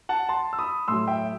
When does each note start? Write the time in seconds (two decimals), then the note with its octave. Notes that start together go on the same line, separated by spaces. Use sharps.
0.09 F#5 A5
0.29 A5 C6
0.53 E6
0.59 B5 D#6
0.88 A2 F#3 C6 E6
1.07 E5 G5